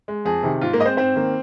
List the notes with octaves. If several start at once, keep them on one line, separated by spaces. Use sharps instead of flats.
G#3
F2 G#4
C3 D#3
G#2 F4
A#3 A#4
G#3 D#5
C4 C5
G#2 C4 C5
D#3 A#3